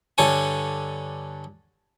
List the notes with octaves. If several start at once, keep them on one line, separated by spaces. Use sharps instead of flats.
G2 D3 A4 C#5 G#5